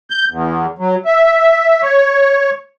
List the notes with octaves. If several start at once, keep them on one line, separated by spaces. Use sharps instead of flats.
G6
E2
F#3
E5
C#5